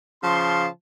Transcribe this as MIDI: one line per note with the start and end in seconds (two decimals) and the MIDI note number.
0.23 0.66 49
0.23 0.66 53
0.23 0.66 81
0.23 0.66 84